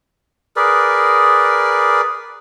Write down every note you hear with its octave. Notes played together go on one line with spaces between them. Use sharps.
G#4 A#4 B4 D5